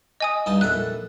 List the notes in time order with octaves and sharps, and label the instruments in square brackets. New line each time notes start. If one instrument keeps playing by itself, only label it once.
[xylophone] D#5 G#5 D#6
[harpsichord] G2 D#4 A5
[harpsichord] A#1 A4 E5 [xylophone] F#6